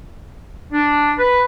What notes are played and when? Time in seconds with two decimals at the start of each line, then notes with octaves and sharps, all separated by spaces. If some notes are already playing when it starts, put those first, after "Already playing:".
0.73 D4
1.18 B4